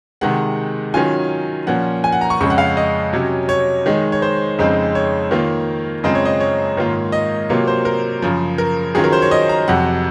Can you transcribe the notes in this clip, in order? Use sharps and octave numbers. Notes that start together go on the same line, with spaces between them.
C3 D#3 G#3 F#5
D#3 F#3 C#4 F4 G#5
A#2 F3 A#3 C#4 F#5
G#5
F#5
A#5
C#6
F2 C#3 G#3 C#4 C#6
F#5
F5
D#5
C3 F#3 C#4
C#5
D#3 G#3 D#4
C#5
C5
F2 C#3 G#3 C4 D#4
C#5
D#3 A#3 F4
F#2 C#3 G#3 C4 F4 D#5
C#5
D#5
C#5
G#2 D#3 A#3 F4
D#5
C3 F#3 A#3 F4 C#5
C5
A#4
F#2 C#3 F3
A#4
D#3 F#3 C#4 F4 G#4
A#4
C5
C#5
D#5
A#5
F2 C3 F#3 F#5